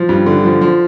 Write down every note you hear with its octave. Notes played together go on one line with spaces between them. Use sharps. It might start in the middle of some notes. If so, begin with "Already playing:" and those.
Already playing: F3
G2
D3
F3
F3